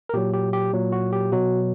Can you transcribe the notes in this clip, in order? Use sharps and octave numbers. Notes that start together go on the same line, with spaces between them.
A#4
A#2 F#3 G4
G4
G4
A#2 F#3
F#4
G4
B2 F#3 F#4